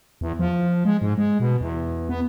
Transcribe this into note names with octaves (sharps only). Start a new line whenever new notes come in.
E2
F3
G#3
G#2
G#3
B2
E2
B3